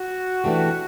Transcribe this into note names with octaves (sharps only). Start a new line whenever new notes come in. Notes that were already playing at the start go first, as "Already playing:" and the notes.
Already playing: F#4
E3 A3 D4 G4